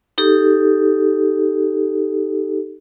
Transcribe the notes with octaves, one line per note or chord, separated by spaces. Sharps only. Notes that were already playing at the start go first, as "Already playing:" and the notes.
D#4 G4 A4